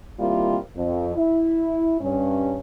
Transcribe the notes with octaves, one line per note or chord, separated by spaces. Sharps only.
D#3 G3 A#3 C4 E4 F4
F2
E4
G2 C#4